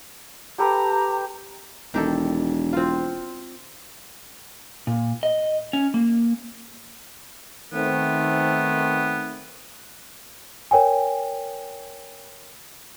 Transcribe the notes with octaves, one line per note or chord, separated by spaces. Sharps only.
G4 A4 B4 A#5
E1 D#3 G4 A4
C4 F4
A#2
D#5
C#4
A#3
D#3 A3 B3 C4
A#4 C#5 G5 G#5